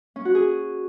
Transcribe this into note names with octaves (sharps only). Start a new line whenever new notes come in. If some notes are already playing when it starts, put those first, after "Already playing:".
C#4
F#4
G#4